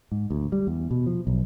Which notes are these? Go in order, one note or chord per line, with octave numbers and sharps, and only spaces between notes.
G#2
D2
G3
E2
B2
F3
B1